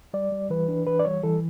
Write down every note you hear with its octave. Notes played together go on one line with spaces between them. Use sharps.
G3 D5
G3
E3 B4
D4
E3 B4
D5
G3 C#5
E3 A4